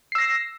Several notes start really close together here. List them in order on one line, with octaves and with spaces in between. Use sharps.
C7 E6 A#6